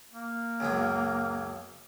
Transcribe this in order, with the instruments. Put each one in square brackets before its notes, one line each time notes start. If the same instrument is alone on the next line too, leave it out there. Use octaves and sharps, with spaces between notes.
[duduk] A#3
[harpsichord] C#2 F#2 B3